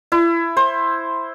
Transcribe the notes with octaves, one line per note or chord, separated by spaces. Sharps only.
E4
C5